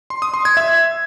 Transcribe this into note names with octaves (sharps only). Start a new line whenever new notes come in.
C6
D#6
C6
G#6
E5